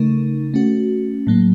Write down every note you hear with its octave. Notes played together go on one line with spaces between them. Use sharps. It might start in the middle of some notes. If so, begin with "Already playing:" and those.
Already playing: C#3 A3 D#4 A#4
A3 C#4 F#4
A2 F#3 A#3